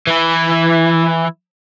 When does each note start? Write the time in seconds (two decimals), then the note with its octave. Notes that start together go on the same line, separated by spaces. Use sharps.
0.07 E3 E4